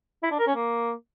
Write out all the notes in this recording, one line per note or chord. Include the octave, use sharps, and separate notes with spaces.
E4
D4
A#4
C#4
A#3